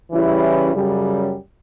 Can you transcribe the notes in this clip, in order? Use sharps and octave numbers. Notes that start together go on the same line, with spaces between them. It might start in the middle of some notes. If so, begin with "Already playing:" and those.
C#3 E3 G3 C#4 E4
F#2 C#3 G3